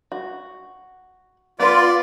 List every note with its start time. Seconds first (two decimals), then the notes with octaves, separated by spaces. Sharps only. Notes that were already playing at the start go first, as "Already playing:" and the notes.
0.12 F#4
1.60 B3 F4 B4 D5